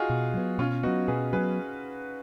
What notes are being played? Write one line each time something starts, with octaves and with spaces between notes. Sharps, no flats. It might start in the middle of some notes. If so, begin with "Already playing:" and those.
Already playing: D#4 F4 F#4 G#4
B2
F#3 B3
B2 C#4 F4
F#3 B3 D#4 F#4
B2 G#4 B4
F#3 B3 G#4 B4